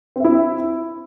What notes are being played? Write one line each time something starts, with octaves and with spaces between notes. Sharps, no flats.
C4 E4 E5